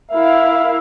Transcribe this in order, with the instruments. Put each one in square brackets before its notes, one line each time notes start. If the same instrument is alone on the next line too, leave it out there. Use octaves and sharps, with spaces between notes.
[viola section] E4 A#4 F5 [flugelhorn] E5